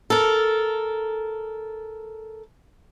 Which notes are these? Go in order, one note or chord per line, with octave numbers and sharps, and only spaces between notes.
A4 A#4